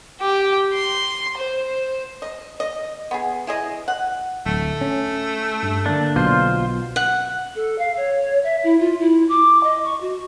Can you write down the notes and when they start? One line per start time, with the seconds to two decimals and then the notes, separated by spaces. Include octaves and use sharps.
0.21 G4
0.73 C6
1.37 C5
2.22 D#5
2.60 D#5
3.11 B3 G#4
3.47 E4 G#4 D#5
3.88 F#5
4.46 D1 A3
4.81 C#4
5.63 G2
5.86 D3 A#3 D4
6.16 B1 B2 F4 C5
6.96 F#5
7.55 A4
7.78 F5
7.96 C#5
8.43 E5
8.63 E4
8.79 F4
8.99 E4
9.28 D6
9.63 D#5
9.83 C#6
10.01 F#4